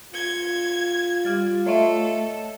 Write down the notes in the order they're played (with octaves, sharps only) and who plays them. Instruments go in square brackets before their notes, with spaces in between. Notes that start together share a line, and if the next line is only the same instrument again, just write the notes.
[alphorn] F4 [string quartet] G#6 [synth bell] C#7 G7
[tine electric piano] G3 [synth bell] F5 F6 A6
[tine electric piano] A3 [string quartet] A4 [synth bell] C#5 D#5 E5